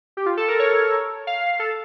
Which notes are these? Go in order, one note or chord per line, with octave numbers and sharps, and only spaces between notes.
G4
F4
A4
A#4
C#5
F5
A4